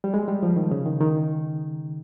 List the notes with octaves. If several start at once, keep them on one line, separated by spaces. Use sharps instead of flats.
G3
G#3
G3
F3
D#3
C#3
D#3
D#3